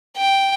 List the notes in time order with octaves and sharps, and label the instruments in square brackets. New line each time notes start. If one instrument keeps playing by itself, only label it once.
[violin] G5